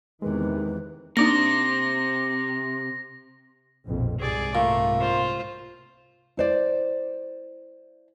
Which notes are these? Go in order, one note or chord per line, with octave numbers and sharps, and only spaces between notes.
E2 C3 D#3 E3 G#3 B4
C3 A#3 D4 D#4 A#6
A#1 F2 B2
C2 G#2 C3 G#4 D5
A#2 A3
F4 C5
E4 C5 D5